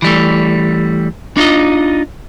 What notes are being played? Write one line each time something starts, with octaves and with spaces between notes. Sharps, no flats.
E3 G3 A3
D4 D#4 F4 D#5